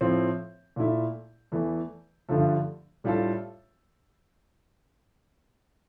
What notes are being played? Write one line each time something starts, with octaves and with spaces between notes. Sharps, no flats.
A2 F3 C4
A#2 A3 E4
E2 E3 A3
G2 D3 F3 A3
A2 G3 D4 F4 A4